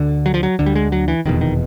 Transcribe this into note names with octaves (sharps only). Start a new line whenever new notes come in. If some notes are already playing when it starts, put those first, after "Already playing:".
Already playing: D2 D3
F#3
F3
F#3
D2 D3
G3
G#3
F#3
E3
F1 E2 B2 D#3
D#3